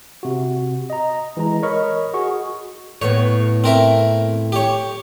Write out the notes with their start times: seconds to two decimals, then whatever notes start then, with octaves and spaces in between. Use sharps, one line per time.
0.23 C3 F#4
0.90 D#5 A#5
1.37 E3 G#3 A#5
1.63 A#4 C#5 D#5 B5 C#6 F6
2.14 F#4 G#4 C#6
3.02 A2 B3 C#5
3.64 C4 A#4 E5
4.52 G4 C#5